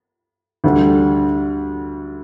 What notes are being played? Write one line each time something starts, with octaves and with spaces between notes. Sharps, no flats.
D2 D3 G3